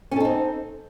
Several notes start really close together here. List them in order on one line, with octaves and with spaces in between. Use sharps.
C#4 A4 D#4 C4